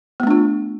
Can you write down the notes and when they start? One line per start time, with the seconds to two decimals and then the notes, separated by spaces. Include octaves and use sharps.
0.20 B3
0.23 A3
0.27 D4
0.31 F4